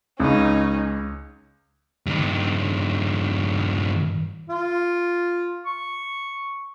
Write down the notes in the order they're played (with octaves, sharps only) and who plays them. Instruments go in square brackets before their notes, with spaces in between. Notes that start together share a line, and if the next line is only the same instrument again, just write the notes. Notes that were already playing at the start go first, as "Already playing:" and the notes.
[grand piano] C#2 [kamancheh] C#4 D#4
[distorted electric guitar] G2 D#3
[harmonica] F4
C#6